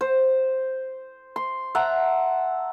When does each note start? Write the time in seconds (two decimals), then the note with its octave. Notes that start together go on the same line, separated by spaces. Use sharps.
0.01 C5
1.36 C6
1.75 E5 F#5 A5 A#5